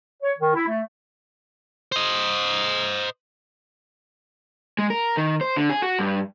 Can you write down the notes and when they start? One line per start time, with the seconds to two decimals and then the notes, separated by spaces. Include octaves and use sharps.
0.23 C#5
0.39 D#3
0.54 E4
0.67 A3
1.92 C5 D#5
4.79 G#3
4.90 A#4
5.17 D#3
5.41 C5
5.56 D3
5.69 G#4
5.82 F#4
5.99 G2